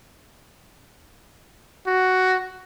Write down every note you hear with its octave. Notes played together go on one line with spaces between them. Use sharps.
F#4